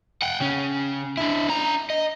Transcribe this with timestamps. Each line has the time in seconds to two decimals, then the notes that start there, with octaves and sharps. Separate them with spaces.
0.22 F#5 G5
0.40 C#3 C#4
1.17 D4 E4
1.49 D4 A#5
1.90 D#5